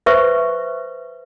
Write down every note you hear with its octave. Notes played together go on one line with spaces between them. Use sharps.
B4 C5 E5 C#6